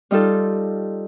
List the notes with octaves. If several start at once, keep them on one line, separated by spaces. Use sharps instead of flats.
G3 D#4 F4 A4